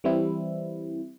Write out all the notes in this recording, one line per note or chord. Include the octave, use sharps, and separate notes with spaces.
E3 G3 C4 E4